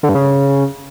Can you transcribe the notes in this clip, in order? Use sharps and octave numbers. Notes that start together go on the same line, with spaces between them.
D3
G2
C#3